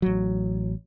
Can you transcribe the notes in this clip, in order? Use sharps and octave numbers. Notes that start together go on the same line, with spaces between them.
A1 F#3